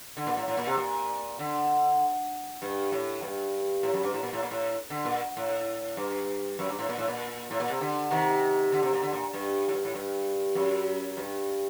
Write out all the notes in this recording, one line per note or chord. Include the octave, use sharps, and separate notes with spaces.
D3
A#2
A2
A2
A#2
C3
A#2
D3
G2
A2
G2
A2
F#2
G2
A2
A#2
A2
A#2
A2
D3
A#2
A2
G2
F#2
G2
A2
A#2
A2
A#2
A2
A#2
C3
D3
C3 D#3
D3
C3
A#2
D3
A#2
G2
A2
G2
A2
G2
F#2
G2